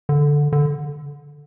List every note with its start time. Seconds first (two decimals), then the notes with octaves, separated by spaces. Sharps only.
0.09 D3
0.52 D3